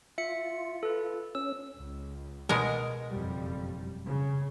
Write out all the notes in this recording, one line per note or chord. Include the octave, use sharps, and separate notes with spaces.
F4 E5 C#7
A4 B4
C#4 E6
C#2
B2 G#3 A#4
F#1 F2 G3
C#3